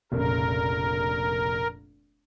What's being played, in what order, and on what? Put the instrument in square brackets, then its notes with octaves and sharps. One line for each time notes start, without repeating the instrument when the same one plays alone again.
[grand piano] F1 A#1 C#3 [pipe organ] A#4